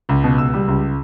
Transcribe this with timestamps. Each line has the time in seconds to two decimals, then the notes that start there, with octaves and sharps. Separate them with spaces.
0.09 C#2
0.24 B2
0.38 C#2 E6
0.54 G3
0.68 C#2